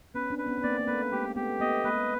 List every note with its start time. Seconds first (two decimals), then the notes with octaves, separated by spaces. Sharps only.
0.14 B3 C#4 B4
0.30 C4 D4
0.38 B4
0.46 B3 C#4
0.58 B3
0.63 A#3 C4 D5
0.79 A#3
0.87 A3 B3 B4
1.12 G#3 A#3 G4
1.36 A3 B3 G4
1.60 A3 B3 D#5
1.84 G#3 A#3 B4